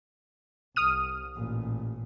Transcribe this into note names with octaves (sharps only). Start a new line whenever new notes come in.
C2 D#6 F6 D#7
A1 A#2